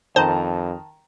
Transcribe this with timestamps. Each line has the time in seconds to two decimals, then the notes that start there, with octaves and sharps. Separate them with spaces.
0.16 F2 D#3 C5 A5 A#5